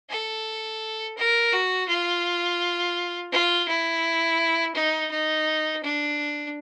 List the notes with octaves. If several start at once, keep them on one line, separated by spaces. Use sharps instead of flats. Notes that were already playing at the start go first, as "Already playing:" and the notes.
A4
A#4
F#4
F4
F4
E4
D#4
D#4
D4